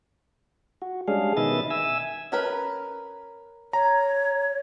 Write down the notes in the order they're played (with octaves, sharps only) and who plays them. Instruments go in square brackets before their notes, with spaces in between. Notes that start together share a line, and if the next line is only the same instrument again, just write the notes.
[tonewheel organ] F#4
G3 G#3 C#4 D4 G#4 F5
B2 D#3 B4 D#5 E5 A6
E5 G#5 E6
[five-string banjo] C#4 A#4 B4
[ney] C#5 [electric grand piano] A#5